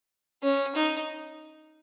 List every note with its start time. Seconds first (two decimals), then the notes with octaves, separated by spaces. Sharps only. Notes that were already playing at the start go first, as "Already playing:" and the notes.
0.43 C#4
0.75 D#4